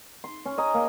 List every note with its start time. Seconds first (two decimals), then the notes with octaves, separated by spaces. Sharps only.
0.24 C6
0.46 C#4
0.58 D#5 G#5 A#5
0.74 A#3